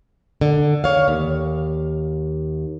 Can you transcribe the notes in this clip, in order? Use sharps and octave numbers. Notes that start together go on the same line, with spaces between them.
D3
C#5 F5
D#2